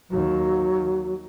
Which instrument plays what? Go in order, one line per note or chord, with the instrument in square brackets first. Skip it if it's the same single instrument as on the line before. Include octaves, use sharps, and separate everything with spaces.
[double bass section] D#2 [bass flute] F#3